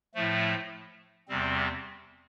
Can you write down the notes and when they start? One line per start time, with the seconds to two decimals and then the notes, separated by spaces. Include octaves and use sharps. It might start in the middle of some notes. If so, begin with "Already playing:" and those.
0.15 A2 F3 A3
1.28 E2 C3 G3 C4